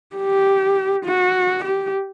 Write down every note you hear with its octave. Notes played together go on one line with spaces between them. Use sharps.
G4
F#4
G4